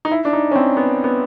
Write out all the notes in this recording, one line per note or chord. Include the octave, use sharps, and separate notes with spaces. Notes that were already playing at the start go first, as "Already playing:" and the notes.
D#4
E4
D4
D#4
C#4
C4
B3
B3